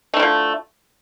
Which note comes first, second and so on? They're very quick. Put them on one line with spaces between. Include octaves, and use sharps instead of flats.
A3 E4 D3 F3